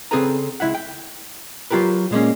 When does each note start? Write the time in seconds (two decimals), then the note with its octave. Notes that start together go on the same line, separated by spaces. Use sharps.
0.11 C#3 C4 G#4 A4 B4 A#5
0.60 C#2 G#3 E4 E5 F#5
0.75 G5
1.71 F#3 F4 G4 A#4 B4
2.11 A#2 G#3 A#3 C#4